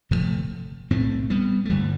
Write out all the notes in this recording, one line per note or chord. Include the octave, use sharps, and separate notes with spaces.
G1 F2 C3 F3 A3
B1 A2 A3 C4
G3 B3
A3
G1 G2 D3 E3 G3